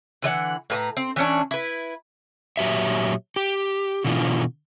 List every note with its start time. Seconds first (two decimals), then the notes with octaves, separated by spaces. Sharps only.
0.22 D3 E3 D#5 F#5
0.70 A2 B4 A#5
0.97 C4
1.16 E3 C#4 D4
1.51 E4 B4
2.57 A#2 F#3 G4 E5
3.36 G4
4.05 B2 D3 E3 F4